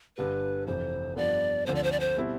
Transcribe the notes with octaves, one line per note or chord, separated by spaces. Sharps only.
G1 G2 D3 G3 B4
F1 F2 E3 C5
G2 F3 B3 D5
D2 D3 F3 C4 C5
D5
C5
D5
C5
B2 G3 C4 E4